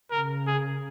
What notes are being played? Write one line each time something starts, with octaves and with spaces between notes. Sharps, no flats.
C#3 A#4
G#4